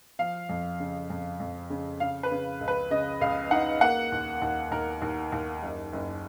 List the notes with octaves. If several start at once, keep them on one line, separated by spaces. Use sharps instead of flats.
F3 F5
F2
C#3
F2
F2
C#3
C#3 F5
B4
C#3
C#2
B4
C#3 D#5
C#2 F5
D#4 F#5
A#3 F#5
D#2
D#2
D#2 A#4
D#2
D#2
F#1
F#1